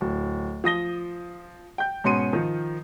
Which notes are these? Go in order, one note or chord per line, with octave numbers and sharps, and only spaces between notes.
D1
F3 D#6 A#6 G7
G5 G6
G#2 B2 C#4 C6 C#7 D#7
D#3 F3